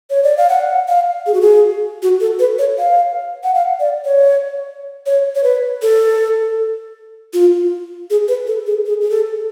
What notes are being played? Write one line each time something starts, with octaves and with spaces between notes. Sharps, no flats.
C#5
D5
F5
F#5
F5
G#4
F#4
G#4
F#4
A4
B4
C#5
F5
F#5
F5
D5
C#5
C#5
C#5
B4
A4
F4
G#4
B4
A4
G#4
G#4
G#4
A4